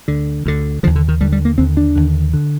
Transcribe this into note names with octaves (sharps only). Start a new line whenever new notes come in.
D2 D3
D2 D3
D3 F3
D#2
D3
D#3
D#2 D3 G3
G3
A#3
D#2 D3 C4
D4
D#2 D3
D3